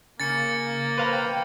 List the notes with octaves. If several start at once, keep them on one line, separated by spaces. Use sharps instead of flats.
C#3 A#3 A6 C#7
B4 C5 F5 A#5
G5